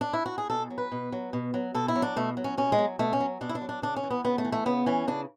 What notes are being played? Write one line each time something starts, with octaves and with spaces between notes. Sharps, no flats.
D4
E4
F#4
G#4
B2 A4
F#3
B4
B2
F#3
B2
F#3
B2 A4
E4
F#3
D4
B2 A3
F#3
C#4
B2 C#4
G#3
F#3
B2 A3
C#4
F#3
B2 D4
E4
D4
F#3
D4
C#3 D4
C#4
E3
B3
C#3 B3
A3
E3
A3
C#3 B3
E3 C#4
C#3 D4